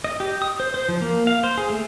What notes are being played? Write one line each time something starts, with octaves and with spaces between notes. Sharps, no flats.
D#5
G4
D#6
C5
C5
F3
A#3
F5
C5
G#4
A3